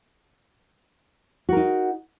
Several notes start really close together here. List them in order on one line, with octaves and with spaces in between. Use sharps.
F#4 A#4 D#4